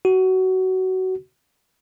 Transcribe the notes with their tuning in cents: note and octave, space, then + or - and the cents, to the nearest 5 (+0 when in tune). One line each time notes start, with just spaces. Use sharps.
F#4 +20